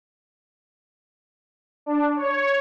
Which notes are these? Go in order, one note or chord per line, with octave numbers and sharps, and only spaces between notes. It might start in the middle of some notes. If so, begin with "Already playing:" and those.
D4
C#5